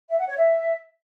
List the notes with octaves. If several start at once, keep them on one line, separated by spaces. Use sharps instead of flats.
E5
F#5
C#5
E5